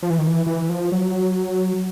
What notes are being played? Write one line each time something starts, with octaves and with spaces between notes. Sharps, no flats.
F3
E3
D#3
E3
E3
F3
F#3